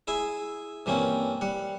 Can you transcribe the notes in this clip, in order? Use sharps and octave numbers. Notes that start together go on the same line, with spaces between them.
E4 G#4 E5
G2 E3 A#3 C4 C#4
G3 F#5